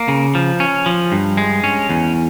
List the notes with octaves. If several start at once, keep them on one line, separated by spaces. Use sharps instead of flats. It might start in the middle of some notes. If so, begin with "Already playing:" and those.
Already playing: A#3
C#3
F3
C#4
F3
G2
G#3
C#4
E2